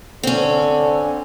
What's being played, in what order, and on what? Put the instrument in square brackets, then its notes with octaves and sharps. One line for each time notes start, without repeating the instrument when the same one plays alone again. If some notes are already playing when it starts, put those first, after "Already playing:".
[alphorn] D3 [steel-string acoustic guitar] C4 C#4